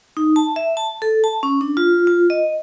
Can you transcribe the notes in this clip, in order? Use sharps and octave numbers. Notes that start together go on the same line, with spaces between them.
D#4
A5
E5
A5
A4
A5
C#4
D4
F4
F4
D#5